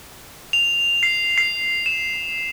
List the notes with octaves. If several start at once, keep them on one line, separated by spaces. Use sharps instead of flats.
F7
C7
C7
E7